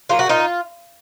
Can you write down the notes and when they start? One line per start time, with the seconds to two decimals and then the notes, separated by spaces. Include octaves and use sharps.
0.09 F#3 A#3 F4
0.19 F#4
0.26 A#2 D#4 F4